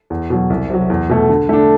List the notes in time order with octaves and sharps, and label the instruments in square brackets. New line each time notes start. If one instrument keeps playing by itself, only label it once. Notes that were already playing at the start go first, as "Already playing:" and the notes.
[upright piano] E2
B2 F#3
C2
C3 F#3
E2
B2 A3
D3
A3 D4